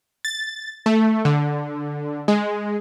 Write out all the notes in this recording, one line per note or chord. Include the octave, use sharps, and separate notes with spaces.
A6
A3
D3
G#3